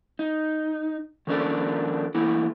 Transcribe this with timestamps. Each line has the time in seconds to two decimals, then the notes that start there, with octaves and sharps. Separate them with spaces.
0.19 D#4
1.27 D#3 F3 A#3 C#4 D4 A4
2.15 E3 A3 A#3 E4